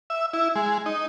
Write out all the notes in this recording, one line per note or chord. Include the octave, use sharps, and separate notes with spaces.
E5
E4
G#3
D#4